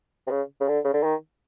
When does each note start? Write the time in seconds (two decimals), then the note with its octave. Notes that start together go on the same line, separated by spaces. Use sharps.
0.27 C3
0.31 C#3
0.61 C#3
0.68 D3
0.85 C#3
0.94 D3
1.04 D#3